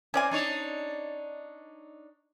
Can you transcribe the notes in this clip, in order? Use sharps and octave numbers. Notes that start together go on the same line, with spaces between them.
C4 C#4 D5 G#5
D4 D#4 C#5